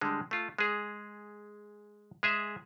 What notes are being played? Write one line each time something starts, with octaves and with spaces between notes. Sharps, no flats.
D3 G3 G#3
A3 F4
G#3 G#4
G#3 G#4 E5